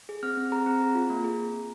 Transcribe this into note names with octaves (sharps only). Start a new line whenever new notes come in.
G#4
C4 F6
C4
G#4 A#5
C4
G#4
F4
A#3
G#4